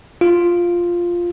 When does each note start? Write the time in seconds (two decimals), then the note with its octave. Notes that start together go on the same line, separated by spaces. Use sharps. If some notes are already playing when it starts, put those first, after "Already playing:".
0.21 F4